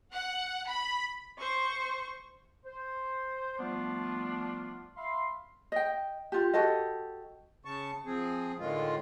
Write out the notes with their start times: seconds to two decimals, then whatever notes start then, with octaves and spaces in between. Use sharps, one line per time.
0.13 F#5
0.69 B5
1.39 C5 C#6
2.65 C5
3.58 F3 G3 A3 B3 D4 F4
4.96 E5 F5 B5 C6
5.72 D#5 G5
6.32 F4 G4
6.54 F#4 G4 A4 D#5
7.65 C#3 A5 C#6
8.06 F3 C4 G#4
8.59 A2 D3 D#3 G#3 F4